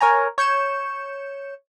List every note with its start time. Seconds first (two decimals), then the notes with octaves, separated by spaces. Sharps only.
0.01 A#4 C#5 G#5 A#5
0.38 C#5 G6 C#7 E7